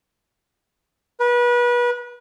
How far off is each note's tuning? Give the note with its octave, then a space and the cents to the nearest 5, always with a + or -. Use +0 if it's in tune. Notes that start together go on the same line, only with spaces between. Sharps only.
B4 -30